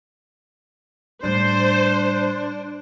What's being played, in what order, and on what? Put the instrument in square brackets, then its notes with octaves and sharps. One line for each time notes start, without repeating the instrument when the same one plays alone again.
[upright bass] A2 G3 [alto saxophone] D4 [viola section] C5